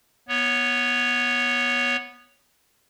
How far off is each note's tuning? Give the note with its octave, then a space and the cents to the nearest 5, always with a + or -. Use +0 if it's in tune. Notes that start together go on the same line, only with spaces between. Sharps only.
B3 -10 C#5 +0